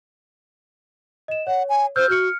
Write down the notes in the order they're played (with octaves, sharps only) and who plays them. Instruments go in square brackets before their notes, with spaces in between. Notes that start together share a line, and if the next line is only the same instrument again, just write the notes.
[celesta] D#5 E7
[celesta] C#5 [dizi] F#5
[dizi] G#5
[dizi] C5 [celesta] E6 F6 G6
[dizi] F#4 [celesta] F6 C#7